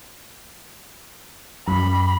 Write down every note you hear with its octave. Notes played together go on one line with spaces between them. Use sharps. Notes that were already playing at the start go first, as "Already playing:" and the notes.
F#2 B5